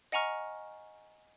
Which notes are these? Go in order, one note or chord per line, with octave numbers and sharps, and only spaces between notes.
D#5 F#5 G#5 A#5 C#6 F6